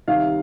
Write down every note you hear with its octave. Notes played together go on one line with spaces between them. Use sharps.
C2 C3 D#3 F5